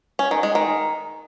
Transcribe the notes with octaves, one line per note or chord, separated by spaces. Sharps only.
C#4
D#3
G#3
D#3